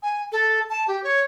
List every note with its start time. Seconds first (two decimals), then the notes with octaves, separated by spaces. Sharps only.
0.03 G#5
0.32 A4
0.70 A5
0.88 G4
1.04 C#5